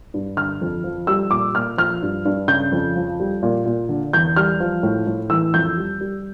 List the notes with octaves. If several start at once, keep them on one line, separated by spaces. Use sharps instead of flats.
G2
D3 F6
F2
F3
G3 E6
A#2 D6
A#2 F6
F3 F6
G2
G2
C#3 G6
F2
F3
G3
A#2
A#2
D3
E2 G6
G3 F6
F3
A2
A2
E3 E6
F2 G6
G3
G3